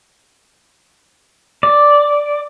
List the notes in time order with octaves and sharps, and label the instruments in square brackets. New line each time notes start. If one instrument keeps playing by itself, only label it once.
[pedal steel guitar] D5